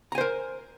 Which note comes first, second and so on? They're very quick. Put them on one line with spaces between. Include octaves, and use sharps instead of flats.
A#5 G#5 C5 A#4